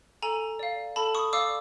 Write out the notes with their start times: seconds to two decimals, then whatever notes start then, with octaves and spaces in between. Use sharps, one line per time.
0.22 A4 G#5 A#5
0.59 D5 F5
0.96 A4 A5 B5
1.15 C#6 D#6
1.33 D5 F5 D6 E6